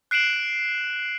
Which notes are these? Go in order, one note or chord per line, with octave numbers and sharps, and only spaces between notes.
F#6 C7 D7 E7 F#7